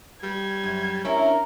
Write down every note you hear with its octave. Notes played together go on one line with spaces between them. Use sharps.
G3 G#6
F#2
C#4 D4 E4 A#4